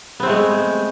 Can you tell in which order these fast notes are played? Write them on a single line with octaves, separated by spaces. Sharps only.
B3 C4 A3 G#3